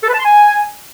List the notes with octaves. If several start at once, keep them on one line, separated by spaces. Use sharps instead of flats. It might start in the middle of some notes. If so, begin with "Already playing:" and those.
A4
B4
A5
C6
G#5